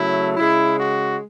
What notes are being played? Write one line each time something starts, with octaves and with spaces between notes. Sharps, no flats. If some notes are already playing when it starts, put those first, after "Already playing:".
Already playing: C#3 F#3 A3 E4
C#3 G#3 E4
F#4